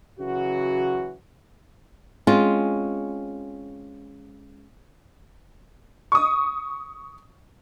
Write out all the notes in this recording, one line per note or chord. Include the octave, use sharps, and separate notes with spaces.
C#3 E3 F#3 F#4
G#3 C4 C#4 F4
C#6 D#6